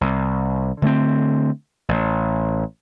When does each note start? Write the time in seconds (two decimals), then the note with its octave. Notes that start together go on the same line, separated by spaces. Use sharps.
0.01 C2
0.82 D3 A3 A#3 C4
1.89 A1